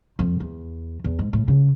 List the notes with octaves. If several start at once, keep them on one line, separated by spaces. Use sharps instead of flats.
F2
E2
E2
G#2
A2
C#3